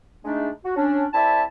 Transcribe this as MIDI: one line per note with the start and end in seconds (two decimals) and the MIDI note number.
0.24 0.49 56
0.24 0.49 57
0.24 0.49 62
0.24 0.49 63
0.64 0.74 66
0.76 1.05 61
0.76 1.05 62
1.13 1.43 36
1.13 1.43 60
1.13 1.43 64
1.13 1.43 74
1.13 1.43 76
1.13 1.43 81